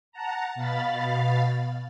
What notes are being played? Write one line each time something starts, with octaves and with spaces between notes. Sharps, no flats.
F#5 A5 A#5
B2 F5 B5 A6